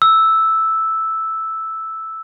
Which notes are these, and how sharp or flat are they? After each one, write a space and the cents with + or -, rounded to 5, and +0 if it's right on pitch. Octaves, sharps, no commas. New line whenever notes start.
E6 -5